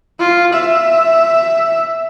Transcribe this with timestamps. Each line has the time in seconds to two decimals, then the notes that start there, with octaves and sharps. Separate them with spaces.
0.20 F4
0.53 E5